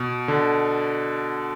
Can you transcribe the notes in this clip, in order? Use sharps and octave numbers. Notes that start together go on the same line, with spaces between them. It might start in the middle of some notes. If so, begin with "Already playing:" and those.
Already playing: B2
D3